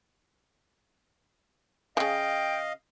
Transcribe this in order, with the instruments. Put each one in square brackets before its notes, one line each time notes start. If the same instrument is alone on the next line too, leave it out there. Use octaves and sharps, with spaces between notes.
[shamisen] C#3 E3 [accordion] D#5 F5 [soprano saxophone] G5